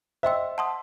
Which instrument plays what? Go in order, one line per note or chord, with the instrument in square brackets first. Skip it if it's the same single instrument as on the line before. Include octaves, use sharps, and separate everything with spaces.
[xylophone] C5 D#5 G5 C6 E6 [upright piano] E5
[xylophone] F#5 A5 C6 D#6